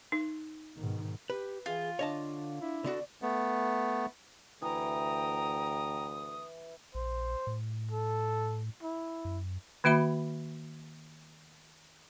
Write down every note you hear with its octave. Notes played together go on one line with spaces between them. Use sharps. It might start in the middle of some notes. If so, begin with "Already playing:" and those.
D#4
G#2 B2 D#3
G4 B4
E3 F4 G#4
D3 D4 C#5 D#5 A5
D4 E4
D3 B3 F#4 D5
A3 B3
D2 E3 G5 A#5 D#6
A#1 C5
A2
A4
E4
F#2
D#3 A#3 F#4 E5 B5